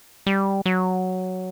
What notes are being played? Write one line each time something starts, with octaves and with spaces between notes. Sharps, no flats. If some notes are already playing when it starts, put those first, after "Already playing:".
G3
F#3